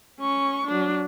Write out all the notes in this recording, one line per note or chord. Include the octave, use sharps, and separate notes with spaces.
C#4 C#6
F#3 D4